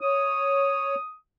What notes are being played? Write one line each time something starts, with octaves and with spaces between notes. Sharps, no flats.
C#5 D#6